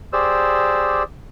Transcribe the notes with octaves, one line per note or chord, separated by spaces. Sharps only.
G4 G#4 C5 D5 E6